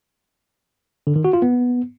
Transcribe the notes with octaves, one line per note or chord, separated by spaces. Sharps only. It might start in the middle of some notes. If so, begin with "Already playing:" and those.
D3
D#3
F#4
F4
B3